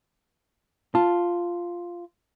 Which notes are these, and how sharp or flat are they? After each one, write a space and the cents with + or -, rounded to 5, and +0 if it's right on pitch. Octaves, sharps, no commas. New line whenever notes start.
F4 +0 A5 +0